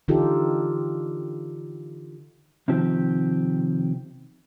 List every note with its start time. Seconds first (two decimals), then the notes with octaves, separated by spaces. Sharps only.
0.08 D3 E3 D#4 F4 G4 A4
2.68 C3 D#3 F3 C4 G4